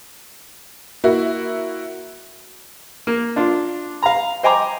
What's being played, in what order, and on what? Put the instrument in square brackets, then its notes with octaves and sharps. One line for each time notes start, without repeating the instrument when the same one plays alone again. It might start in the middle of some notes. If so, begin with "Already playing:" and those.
[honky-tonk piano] A#3 E4 F#4
[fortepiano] A#3
D4 F4
F5 A#5
C5 D#5 G5 G#5 A#5 D6